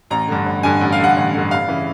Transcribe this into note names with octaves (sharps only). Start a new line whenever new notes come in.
A1 A#5
G2 D3
A1
G2 D3 G#5
A1
F5
G2 D3 F#5
A1
G2 D3
F1 F5
C#3 E3